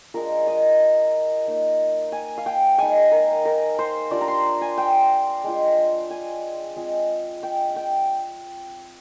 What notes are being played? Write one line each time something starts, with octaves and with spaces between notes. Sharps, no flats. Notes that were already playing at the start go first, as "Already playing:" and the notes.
G#3 D4 F4 A#4
D#5
A#3 D#4
G#5
F5
G5
G#3 D#4 G#5
A#4
A#4
C5
G3 D4 F4 D5
A#5
C6
G#5
G5
G#3 D4 F4
G#5
G#3 C4 F4
G5
G5